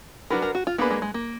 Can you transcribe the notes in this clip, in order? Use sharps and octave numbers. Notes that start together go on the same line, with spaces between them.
F#3 D4 F#4 A#4 B4
A#4
F#4
F4
A#3 B3 D4 G#4 B4
G#3
G#3
A#3